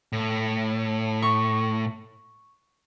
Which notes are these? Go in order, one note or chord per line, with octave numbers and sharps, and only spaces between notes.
A2
C#6